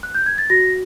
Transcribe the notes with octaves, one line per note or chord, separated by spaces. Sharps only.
F#6
G6
G#6
A6
F#4 A#6